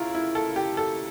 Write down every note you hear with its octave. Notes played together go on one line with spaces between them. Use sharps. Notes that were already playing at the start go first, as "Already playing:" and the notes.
Already playing: D#2 C#3 E4 F4 A#4
E4
A4
G4
A4